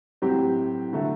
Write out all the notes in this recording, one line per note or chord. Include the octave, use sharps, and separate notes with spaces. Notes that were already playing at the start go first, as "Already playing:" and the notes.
A2 F#3 C4 G4
D3 F#3 A3